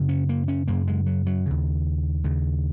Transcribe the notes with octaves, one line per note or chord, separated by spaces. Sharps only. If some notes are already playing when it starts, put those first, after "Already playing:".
Already playing: F#2 C#3
C#4
A#3
C#4
F#2 C#3 A#3
G#3
F#3
F#3
D#2 C#3
D#2 C#3